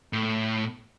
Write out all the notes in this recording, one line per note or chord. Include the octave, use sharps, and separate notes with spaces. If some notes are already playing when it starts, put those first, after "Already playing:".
A2